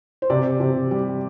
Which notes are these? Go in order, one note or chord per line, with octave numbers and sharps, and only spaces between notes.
C5
C3 D5
C3
G3